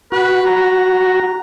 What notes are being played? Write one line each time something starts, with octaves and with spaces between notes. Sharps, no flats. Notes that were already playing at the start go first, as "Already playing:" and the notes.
F#4 B4
A#5